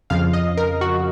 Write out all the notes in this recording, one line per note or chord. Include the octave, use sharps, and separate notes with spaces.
F2 C#3 F3 F5
D#5
A#4
F#4